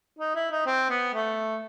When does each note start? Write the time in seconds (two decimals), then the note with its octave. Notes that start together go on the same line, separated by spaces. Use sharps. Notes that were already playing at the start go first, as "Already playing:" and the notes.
0.18 D#4
0.35 E4
0.51 D#4
0.66 C4
0.90 B3
1.13 A3